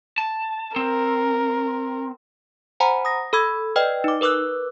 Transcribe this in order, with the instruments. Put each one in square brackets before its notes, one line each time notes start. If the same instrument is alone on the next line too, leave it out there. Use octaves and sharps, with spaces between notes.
[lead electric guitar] A5
[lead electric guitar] C4 [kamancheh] A#4
[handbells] C5 F#5 G#5 A#5 B5
D#6 A#6
A4 B5 E6 G#6
B4 D5 D#5 G5 F6
D#4 D6
A#4 B4 D6 E6 F#6